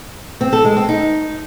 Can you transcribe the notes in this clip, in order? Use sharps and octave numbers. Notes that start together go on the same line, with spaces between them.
C4
A4
G#3
C4
D#4